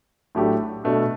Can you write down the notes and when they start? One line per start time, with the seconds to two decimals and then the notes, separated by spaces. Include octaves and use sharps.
0.35 A2 F#3 A3 D4 G4
0.84 B2 A3 D4